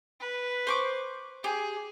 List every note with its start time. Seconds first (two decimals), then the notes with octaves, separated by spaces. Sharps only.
0.20 B4
0.67 C5 C#6 D6
1.44 G4 G#4